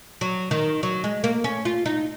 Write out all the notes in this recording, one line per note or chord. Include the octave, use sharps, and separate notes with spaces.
F#3
D#3
F#3
G#3
A#3
C#4
F4
D#4